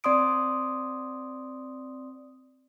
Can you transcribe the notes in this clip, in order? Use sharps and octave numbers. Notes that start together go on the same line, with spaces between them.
C4 D5 C6 D#6 D7